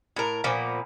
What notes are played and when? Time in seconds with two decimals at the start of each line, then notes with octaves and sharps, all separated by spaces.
0.16 A2 A#4
0.44 A#2 F3 A#3 B3